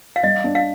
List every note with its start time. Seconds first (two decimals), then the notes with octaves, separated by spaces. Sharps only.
0.16 F5
0.23 G3 D#5
0.44 D4
0.55 F5